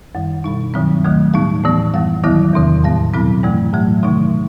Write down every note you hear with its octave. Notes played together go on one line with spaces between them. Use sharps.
F#2 D#3 G3
B2 G3 D#4
G2 D#3 F#3 C4
D#2 D#3 F#3 A3
A2 G3 B3 D#4
A2 E3 B3
F#2 E3 G3
D#2 D#3 F#3 B3 E4
E2 C3 D#3
A2 G3 B3
B2 F#3 C4 E4
G2 E3 A3
A2 F#3 A3
C3 D#3 F#3 A3 D#4